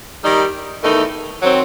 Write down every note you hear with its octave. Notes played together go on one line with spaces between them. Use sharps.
D#3 G3 D#4 G4
E2 D#3 A3 D#4
D#3 F#3 C4